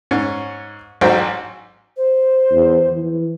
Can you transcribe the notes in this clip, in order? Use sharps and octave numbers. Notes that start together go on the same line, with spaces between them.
G#2 C#4
A1 G#2 F#3 C5 G5
C5
E2
E3